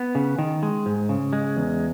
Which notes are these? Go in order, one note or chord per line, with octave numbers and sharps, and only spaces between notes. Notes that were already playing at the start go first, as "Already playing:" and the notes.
Already playing: B3
C#3
D#3
G#3
G#2
C#3
G#3
E2